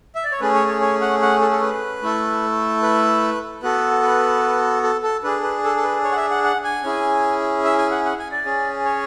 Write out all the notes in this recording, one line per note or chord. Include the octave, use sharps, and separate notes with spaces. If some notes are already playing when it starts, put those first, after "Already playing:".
E5
D5
C#5
A3 C#4 G#4 B4
C#5
C#5
C#5
F#5
F#5
A4
A4
B4
A3 E4 A4
B4
B3 F#4 A4 B4
B4
A4
A4
D4 G#4 B4
B4
A4
A4
B4
C#5
F#5
E5
F#5
F#5
G#5
C#4 E4 G#4
E5
G#5
F#5
F#5
G#5
D5
C#4 G#4
C#5